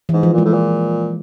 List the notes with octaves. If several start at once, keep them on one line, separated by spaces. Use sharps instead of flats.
E3
G#2
F3
A#2 G#3
A2
A#2